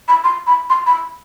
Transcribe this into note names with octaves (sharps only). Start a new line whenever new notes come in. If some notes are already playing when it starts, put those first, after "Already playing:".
B5
C6
B5
C6
B5